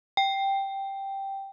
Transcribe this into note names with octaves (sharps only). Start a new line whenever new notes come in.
G5